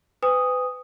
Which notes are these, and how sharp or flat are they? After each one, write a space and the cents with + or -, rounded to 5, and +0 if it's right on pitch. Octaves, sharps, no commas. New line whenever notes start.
B4 +35 G#5 -40 D#6 +0